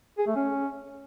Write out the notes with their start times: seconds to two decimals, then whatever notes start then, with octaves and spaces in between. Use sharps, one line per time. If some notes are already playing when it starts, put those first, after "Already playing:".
0.18 G#4
0.27 A3
0.36 C#4